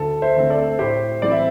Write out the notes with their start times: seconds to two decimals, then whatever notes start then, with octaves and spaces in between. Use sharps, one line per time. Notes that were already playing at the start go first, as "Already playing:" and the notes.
Already playing: D2 A4
0.22 C5 E5
0.36 D3 A3 C4
0.50 A4 D5
0.79 A2 G4 C5
1.22 E3 G3 C4 D5
1.32 E5